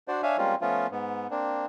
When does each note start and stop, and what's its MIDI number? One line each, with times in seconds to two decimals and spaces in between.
0.08 0.22 62
0.08 0.22 66
0.08 0.22 72
0.08 0.22 74
0.23 0.37 62
0.23 0.37 73
0.23 0.37 76
0.23 0.37 77
0.23 0.37 80
0.38 0.55 55
0.38 0.55 56
0.38 0.55 58
0.38 0.55 60
0.38 0.55 61
0.38 0.55 65
0.61 0.87 53
0.61 0.87 57
0.61 0.87 59
0.61 0.87 61
0.61 0.87 65
0.91 1.27 44
0.91 1.27 59
1.31 1.66 58
1.31 1.66 60
1.31 1.66 62